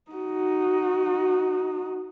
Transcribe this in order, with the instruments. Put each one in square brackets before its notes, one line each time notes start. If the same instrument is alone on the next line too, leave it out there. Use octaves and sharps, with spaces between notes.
[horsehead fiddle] D#4 F#4